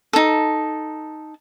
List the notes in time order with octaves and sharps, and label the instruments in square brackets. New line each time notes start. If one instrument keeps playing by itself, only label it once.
[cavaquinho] D#4 A4